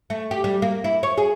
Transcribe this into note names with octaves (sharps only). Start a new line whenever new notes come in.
A3
G4
G3
A#3
E4
C#5
G#4